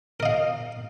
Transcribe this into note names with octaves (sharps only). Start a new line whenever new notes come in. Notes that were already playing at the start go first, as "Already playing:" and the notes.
A#4 D#5 F5